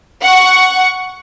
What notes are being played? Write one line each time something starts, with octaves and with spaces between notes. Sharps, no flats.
F#5 C#6